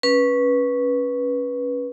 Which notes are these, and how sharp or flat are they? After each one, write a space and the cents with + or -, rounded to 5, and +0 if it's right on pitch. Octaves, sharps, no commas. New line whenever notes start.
C#4 +0 B4 -15